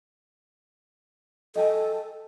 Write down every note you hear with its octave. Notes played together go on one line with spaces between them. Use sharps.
A4 D#5 G5 G#5